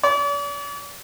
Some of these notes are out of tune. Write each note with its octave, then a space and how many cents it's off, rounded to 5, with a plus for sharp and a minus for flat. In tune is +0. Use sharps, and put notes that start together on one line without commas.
D5 -45